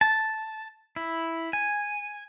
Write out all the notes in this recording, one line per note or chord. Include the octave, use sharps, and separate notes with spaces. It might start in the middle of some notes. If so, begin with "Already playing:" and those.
A5
E4
G#5